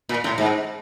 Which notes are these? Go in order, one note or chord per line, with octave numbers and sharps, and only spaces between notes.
A#2
A2
G#2